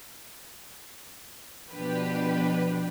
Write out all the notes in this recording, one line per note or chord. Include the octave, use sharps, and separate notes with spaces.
B2 F3 D4 G4 B4